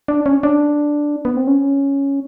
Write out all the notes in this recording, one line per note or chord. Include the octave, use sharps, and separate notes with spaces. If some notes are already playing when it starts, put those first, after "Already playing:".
D4
C#4
D4
B3
C4
C#4